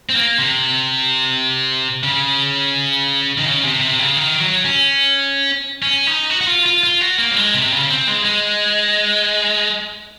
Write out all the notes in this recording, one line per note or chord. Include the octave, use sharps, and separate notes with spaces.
C4
A#3
C3
C#3
D#3
C#3
C3
C3
C#3
D#3
F#3
C#4
C#4
D#4
F#4
F#4
F4
F4
F4
F#4
A#3
F#3
G#3
C3
C#3
C4
G#3
G#3